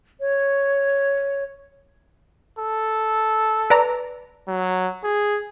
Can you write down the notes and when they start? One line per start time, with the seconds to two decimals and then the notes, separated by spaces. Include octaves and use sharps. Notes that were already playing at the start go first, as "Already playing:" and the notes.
0.20 C#5
2.58 A4
3.70 B4 D5 A#5
4.48 F#3
5.04 G#4